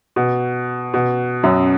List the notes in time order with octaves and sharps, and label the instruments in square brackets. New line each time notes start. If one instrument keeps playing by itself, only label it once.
[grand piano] B2
B2
F#2